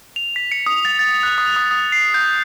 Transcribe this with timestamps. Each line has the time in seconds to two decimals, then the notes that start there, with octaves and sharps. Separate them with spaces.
0.16 F7
0.36 B6
0.52 C#7
0.66 D#6
0.85 A6
0.99 A6
1.23 F#6
1.38 D#6
1.56 D#6
1.71 D#6
1.92 C7
2.14 G6